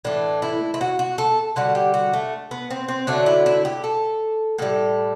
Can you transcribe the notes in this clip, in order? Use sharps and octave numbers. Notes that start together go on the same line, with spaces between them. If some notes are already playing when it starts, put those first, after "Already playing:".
A2 E3 A3 D4
E4
E4
F#4
F#4
A4
D3 G3 F#4
G4
F#4
A3
B3
C4
C4
D3 F#3 A3 D4
E4
E4
G4
A4
A2 G3 A4